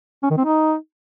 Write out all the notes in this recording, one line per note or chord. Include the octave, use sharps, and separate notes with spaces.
C#4
D#3
C4
D#4